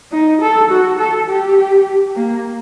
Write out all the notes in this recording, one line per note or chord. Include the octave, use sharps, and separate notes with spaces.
D#4
A4
F#4
A4
G4
A#3